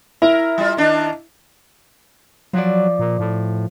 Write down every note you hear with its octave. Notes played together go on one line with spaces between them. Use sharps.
E4 A#4
G3 F4
D#3 D4
F3 F#3 D5
A#2
A2